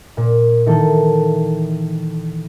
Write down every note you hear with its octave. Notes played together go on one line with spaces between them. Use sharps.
A#2
D#3 E3 A#3 A4